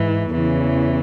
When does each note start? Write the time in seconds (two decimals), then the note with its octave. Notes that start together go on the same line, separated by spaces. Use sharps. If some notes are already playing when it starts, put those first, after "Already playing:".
Already playing: G#2 E3
0.32 E2 C#3 E3